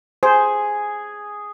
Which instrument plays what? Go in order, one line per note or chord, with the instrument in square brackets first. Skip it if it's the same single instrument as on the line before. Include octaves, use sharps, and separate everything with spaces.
[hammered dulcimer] G#4 [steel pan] C5